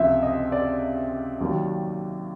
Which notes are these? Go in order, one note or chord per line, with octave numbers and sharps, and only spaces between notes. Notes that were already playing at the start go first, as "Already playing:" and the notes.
Already playing: C#2 C3 F3 E5
D#5
D5
D#2 D#3 F#3